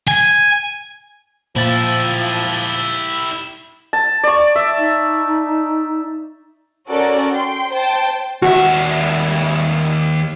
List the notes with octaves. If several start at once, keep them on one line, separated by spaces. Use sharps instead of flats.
G#5
A#2 F3 E4 G4 A6
A5
D5 C#6
E5
D#4
C#4 F#4 A4 A#4 D5
G5 C6
C5 G5 A5
D#2 F#4 E5